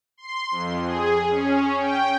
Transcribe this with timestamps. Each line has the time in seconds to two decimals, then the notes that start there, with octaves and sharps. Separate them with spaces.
0.17 C6
0.51 F2
0.84 G#4
1.30 C#4
1.79 G5